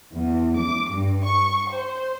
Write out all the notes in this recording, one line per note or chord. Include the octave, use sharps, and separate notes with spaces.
E2
D6
G2
C#6
C5